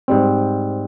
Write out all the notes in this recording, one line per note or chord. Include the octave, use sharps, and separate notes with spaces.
G#2 G3 C4